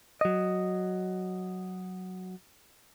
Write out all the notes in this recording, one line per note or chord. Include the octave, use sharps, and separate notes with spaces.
F#3 D#5